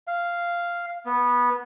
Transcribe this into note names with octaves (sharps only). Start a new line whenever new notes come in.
F5
B3